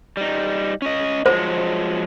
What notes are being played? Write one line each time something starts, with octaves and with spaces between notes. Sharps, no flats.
G3 D#4
C#4 D#5
F3 F#3 G#3 C5